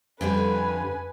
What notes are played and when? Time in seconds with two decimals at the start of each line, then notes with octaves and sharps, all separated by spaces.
0.21 F2 D3 G3 B4 G#5